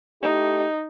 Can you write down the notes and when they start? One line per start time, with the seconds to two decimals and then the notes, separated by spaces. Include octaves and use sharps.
0.22 A3 D#4 E4 G4